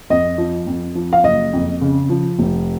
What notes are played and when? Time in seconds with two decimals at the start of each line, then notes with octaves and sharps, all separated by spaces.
0.10 F2 D#5
0.38 F3
0.67 F2
0.95 F3
1.13 F5
1.24 F#1 D#5
1.53 F2
1.81 C#3
2.10 F3
2.39 F1